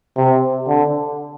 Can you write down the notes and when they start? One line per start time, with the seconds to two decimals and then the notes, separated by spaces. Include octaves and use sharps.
0.16 C3
0.67 D3